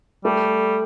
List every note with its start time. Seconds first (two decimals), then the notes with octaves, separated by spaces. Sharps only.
0.25 G3 A3